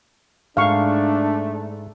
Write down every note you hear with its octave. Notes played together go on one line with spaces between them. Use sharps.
G#2 A3 D4 F5 C#6